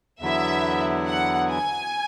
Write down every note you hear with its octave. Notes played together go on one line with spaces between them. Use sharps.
E2 D3 F#3 B3 E4 E5
F#5
G#5